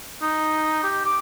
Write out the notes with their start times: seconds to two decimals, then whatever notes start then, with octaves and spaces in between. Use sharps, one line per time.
0.22 D#4
0.84 G4
1.05 D6